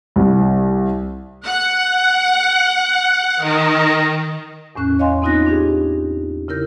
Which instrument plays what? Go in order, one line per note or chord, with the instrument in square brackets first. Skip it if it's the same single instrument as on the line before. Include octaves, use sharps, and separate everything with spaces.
[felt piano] C2
[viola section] F#5
D#3
[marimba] E2 A2 C#4 F#6
C#5 D#5 F5 G#5 C6
B3 C4 D#4 F4 F#6 A#6
D4 G4 G#4
C#3 E4 A#4 G6